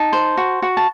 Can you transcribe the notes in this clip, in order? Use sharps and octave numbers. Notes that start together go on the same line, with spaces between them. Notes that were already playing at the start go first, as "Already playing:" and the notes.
Already playing: D#4 A5
C5
F#4
F#4
A5